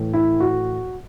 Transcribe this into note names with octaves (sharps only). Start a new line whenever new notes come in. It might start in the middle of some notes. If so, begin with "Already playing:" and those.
Already playing: A2 E3
E4
F#4